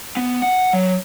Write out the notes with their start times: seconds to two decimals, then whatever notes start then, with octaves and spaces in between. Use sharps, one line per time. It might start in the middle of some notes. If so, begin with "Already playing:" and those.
0.17 B3
0.42 F#5
0.73 F#3